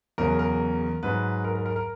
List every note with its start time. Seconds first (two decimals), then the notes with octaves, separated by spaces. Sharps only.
0.18 E2 C#3 F#3 A#4
0.39 A#4
1.03 G#2 F#3 B4
1.44 A#4
1.55 A#4
1.66 A#4
1.76 A#4